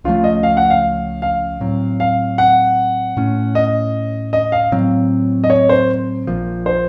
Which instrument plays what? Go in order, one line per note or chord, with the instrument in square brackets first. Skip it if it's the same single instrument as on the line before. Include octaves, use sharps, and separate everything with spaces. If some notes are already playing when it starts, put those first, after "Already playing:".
[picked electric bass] C#2 C#3 F3 A3 [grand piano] F4
[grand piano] D#5
F5
F#5
F5
F5
[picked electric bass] A2 F#3 C4
[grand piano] F5
F#5
[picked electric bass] A2 A3 C#4
[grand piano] D#5
D#5
F5
[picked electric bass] A2 F#3 C4
[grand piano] D#5
C#5
C5
[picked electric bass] A#1 A#2 F3
[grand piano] C5